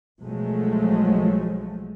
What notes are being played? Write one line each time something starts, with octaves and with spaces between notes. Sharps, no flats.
B1 F3 F#3 G#3 A3